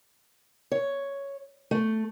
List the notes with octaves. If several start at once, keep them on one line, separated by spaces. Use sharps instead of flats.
C#5
A3